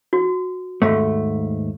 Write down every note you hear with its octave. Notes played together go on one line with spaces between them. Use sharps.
F#4
D#2 G#2 A3